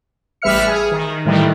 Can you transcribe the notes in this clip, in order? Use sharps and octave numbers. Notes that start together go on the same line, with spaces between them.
A1 G3 B4 E5 F6 C#7
G#4
D#3
A2 D#3 E3 G3